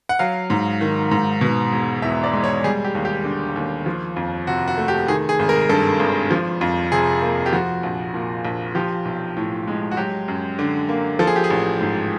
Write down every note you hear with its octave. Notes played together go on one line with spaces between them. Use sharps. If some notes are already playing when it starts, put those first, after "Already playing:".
F#5
F#3 F5
G#2
D#3
G#2
B2
E1
E2 E5
D5
G#3
C#5
G3 G#4
G4
D#2
G4
D3
D#2
F3
F2
C3 F#4
F#4
A3
G4
D#3 G#4
G#4
G#1
A#4
G2 A4
G#1
F3
F2
C3 G#4
A#3
G4
F3 F#4
A#1
A#2
A#1
F3 G4
B1
A2
G#3
F#4
F#3 G4
F#2
D3
A#3
F3 A4
G#4
G4
G#4
A1
G#2